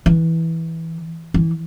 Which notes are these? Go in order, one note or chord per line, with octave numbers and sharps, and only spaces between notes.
E3
E3